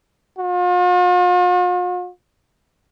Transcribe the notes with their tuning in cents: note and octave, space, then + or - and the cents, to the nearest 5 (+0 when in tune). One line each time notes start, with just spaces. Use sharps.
F4 +45